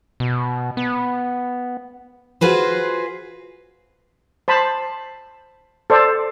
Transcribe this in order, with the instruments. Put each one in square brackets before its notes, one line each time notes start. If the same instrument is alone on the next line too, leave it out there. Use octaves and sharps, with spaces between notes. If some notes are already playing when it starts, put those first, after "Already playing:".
[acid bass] B2
B3
[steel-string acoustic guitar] F4 F#4 G#4 B4 C5
[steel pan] C5 A5 B5
A4 C5 D5